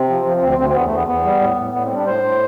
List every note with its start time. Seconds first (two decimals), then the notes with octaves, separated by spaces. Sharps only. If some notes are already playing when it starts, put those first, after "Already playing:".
Already playing: C3 C4
0.09 F3
0.26 F3
0.42 D2 C4
0.58 D2 C4
0.69 C4
0.74 E2 B3
0.86 A3
0.91 E2
0.97 B3
1.07 E2 B3
1.24 G3
1.40 A2
1.57 A2
1.74 A2 B3
1.85 C4
1.90 G3
1.95 D4
2.07 A2 C5
2.23 A2